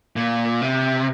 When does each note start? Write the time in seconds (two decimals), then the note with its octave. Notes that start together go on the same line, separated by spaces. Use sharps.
0.16 A#2
0.62 C3